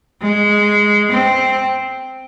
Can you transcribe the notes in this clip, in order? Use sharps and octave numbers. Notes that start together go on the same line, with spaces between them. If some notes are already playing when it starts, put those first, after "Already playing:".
G#3
C4